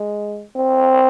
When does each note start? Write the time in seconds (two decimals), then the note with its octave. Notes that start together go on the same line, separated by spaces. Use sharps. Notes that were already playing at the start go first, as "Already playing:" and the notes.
Already playing: G#3
0.56 C4